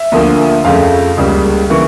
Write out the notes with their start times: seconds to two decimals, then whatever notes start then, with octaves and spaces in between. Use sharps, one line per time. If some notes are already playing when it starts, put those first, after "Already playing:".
Already playing: E5
0.12 D2 D3 F3 A#3
0.65 F2 C#3 F3 A3 F5
1.17 C#2 C#3 G3 A#3
1.70 C#3 E3 A#3 C#6